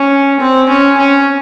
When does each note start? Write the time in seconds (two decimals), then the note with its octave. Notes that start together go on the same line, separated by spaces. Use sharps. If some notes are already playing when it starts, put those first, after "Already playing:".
Already playing: C#4
0.40 C4
0.69 C#4
0.97 C#4